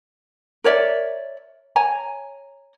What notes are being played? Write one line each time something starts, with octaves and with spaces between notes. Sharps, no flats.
A#4 C#5 D5 E5
C#5 G#5 A#5